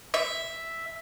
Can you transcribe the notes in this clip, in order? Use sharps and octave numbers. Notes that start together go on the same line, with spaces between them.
E5